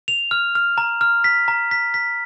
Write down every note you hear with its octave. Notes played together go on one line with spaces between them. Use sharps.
F7
F6
F6
A#5
F6
B6
A#5
B6
B6